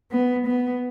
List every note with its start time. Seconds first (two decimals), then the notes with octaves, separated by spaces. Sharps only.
0.11 B3
0.47 B3